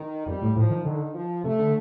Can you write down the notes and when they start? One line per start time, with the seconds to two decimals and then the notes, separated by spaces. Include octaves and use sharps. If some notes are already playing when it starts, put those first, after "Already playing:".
Already playing: D#3
0.26 F2 G3
0.42 A2
0.56 A2 F3
0.71 D#3
0.85 D3 D#3
1.14 F3
1.44 C3 A3
1.59 D3